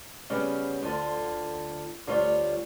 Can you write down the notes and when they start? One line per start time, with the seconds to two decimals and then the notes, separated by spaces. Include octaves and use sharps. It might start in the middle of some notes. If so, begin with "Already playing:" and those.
0.30 C#3 G3 B3 C#4
0.82 D2 D3 F4
2.07 D2 G3 F4 C#5